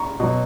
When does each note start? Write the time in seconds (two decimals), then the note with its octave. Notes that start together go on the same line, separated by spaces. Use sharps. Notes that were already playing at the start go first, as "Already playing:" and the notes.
Already playing: A#5 C#6
0.20 B2 F#3